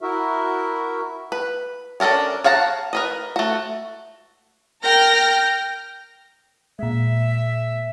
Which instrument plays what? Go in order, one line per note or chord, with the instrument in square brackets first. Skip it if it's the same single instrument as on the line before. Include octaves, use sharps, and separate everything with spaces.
[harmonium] E4 F#4 A#4 E5
[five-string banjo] B4
C#4 D4 A4 A#4 C#5
C#5 F5 F#5 A5 A#5
A#4 B4 D#5
A3 F#4
[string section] A#4 G5 F6 G6 A#6
[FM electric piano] A#2 G#3 [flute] E5